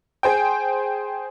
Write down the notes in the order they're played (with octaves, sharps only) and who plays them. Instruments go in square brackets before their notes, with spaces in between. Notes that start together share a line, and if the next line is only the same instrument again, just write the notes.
[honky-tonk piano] G#4 C5 G5